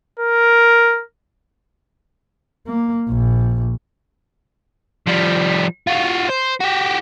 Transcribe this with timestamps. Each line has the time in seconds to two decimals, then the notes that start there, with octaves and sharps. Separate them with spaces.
0.19 A#4
2.67 A#3
3.09 A#1
5.07 F3 G3
5.87 F4 F#4
6.30 C5
6.61 F#4 G4